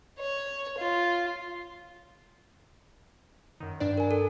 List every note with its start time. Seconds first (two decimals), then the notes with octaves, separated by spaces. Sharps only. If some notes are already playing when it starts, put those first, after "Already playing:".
0.19 C#5
0.78 F4
3.60 F#2 D#3
3.80 G2 D4 D5
3.98 A#4 G#5
4.11 A4